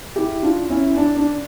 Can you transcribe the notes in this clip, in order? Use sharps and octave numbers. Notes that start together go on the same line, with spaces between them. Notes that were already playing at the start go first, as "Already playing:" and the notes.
E4 G4
D4 F4
C#4 E4
D4
D4